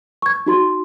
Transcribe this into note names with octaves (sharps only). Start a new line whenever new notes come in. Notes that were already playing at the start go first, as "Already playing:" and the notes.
C#6 G#6
D#4 F#4 C6